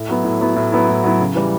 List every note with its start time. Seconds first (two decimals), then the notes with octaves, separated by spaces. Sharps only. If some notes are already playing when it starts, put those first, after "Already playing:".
Already playing: A2
0.09 F#3 B3 E4
0.25 A2
0.40 F#3 B3 E4
0.56 A2
0.72 F#3 B3 E4
0.88 A2
1.03 F#3 B3 E4
1.20 C#3
1.35 E3 G3